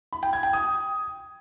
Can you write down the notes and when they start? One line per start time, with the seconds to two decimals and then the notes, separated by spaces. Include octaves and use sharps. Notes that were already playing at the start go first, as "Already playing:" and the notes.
0.13 B5
0.23 G5
0.33 G#6
0.43 G5
0.53 D#6